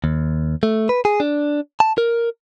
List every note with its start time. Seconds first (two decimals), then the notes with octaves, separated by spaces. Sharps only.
0.04 D#2
0.63 A3
0.89 B4
1.05 G#4
1.20 D4
1.80 A5
1.98 A#4